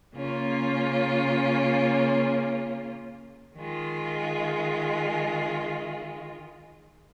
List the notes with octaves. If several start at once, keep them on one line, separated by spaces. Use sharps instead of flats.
C#3 A#3 C#4 F4
D#3 G#3 F4